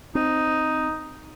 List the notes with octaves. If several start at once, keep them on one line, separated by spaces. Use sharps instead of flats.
C4 D#4